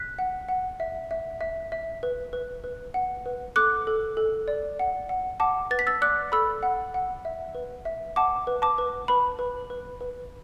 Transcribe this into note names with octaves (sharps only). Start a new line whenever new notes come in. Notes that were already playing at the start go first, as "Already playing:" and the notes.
Already playing: F#6 B6
F#5
F#5
E5
E5
E5
E5
B4
B4
B4
F#5
B4
A4 D6 F#6
A4
A4
D5
F#5
F#5
F#5 A5 D6
B4 A6
B6
E6 A6
D5 D6 F#6
A4 B5 E6
F#5
F#5
E5
B4
E5
F#5 A5 D6
B4
A5 D6
B4
B4 B5
B4
B4
B4